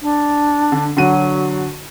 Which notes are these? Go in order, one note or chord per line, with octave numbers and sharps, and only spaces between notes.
D4
D3
D3 F#3 F#4 D#7